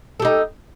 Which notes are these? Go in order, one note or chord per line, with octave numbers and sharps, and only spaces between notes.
D#4 G4 A4